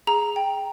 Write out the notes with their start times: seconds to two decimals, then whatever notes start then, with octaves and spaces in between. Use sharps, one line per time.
0.07 G#4 A#5
0.36 G5